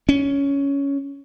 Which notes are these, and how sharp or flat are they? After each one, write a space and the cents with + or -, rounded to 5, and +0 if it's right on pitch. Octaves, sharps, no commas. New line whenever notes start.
C#4 +10